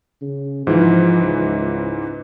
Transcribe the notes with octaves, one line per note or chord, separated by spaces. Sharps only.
C#3
G#2 E3 F3
C#2